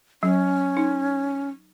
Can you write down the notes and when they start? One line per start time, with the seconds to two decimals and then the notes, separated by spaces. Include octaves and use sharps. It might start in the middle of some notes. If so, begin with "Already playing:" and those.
0.23 F#3 C#4
0.77 D#4